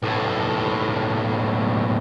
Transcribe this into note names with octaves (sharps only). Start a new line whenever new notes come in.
B1 A2